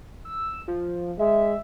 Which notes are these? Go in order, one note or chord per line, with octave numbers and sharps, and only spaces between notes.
E6
F3
G#3 E5